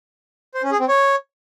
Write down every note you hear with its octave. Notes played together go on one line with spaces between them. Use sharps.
C5
C#4
G#4
C4
C#5